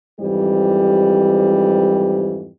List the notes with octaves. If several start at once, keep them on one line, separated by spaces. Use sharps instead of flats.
F2 G#2 E3 G3 G4